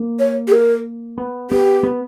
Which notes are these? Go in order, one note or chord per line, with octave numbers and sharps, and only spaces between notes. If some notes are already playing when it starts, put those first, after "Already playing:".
Already playing: A#3
C#5
G4
A#4
B3
B3 G4
B3